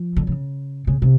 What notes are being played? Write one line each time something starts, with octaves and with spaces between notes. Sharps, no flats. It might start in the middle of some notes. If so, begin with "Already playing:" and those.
Already playing: F3
D3
C#3
C#3
C3